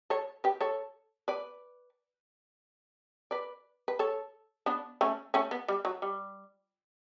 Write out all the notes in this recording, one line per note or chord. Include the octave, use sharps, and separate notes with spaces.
A4 C#5
G4 B4
A4 C#5
B4 D5
B4 D5
B4
A4 C#5
B3 D4
A3 C#4
A3 C#4
B3
G3
F#3
G3